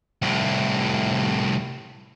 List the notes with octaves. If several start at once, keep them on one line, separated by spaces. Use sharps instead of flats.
C2 A2